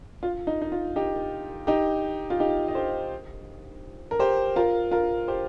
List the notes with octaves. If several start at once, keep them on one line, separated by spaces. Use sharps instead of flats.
F4
D#4
D#4
F4
D#4 G4
D#4 G4
F4
D#4 G4
D#5
G4 C5
A#4
G4 C5
F4 A#4
F4 A#4
G4 C5